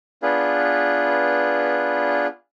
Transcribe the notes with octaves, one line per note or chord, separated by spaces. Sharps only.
B3 D4 F4 G#4 B4